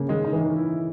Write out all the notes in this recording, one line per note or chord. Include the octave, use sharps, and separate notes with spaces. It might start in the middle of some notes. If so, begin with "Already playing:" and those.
Already playing: C#3 A#3
D#3 G#3
D#4
E3
D#3
E4